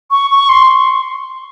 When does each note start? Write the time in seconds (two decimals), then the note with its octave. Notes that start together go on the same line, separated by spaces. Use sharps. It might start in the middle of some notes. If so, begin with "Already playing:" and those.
0.11 C#6
0.30 C#6
0.49 C6